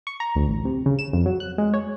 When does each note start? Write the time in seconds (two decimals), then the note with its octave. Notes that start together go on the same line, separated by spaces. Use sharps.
0.07 C#6
0.20 A#5
0.35 D2
0.49 A1
0.65 C3
0.86 C#3
0.99 E7
1.13 F2
1.26 F#3
1.40 F#6
1.58 G#3
1.74 C#5